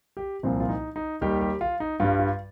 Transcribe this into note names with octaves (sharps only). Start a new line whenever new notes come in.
G4
C2 A#2 F3 C4
F4
D#4
D#4
D#2 D#3 G3 G4
G4
F4
D#4
G2 G3 F4
F4